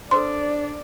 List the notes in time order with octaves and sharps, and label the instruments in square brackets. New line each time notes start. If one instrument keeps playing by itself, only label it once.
[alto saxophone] D4 [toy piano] A4 B4 C5 [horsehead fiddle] D5 [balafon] C6